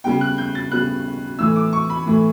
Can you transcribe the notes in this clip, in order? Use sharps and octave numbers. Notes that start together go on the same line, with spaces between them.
C#3 G3 B3 G5
F#6
G6
A6
C#3 G3 B3 F#6
A2 E3 A3 E6
D6
C#6
B5
A2 E3 A3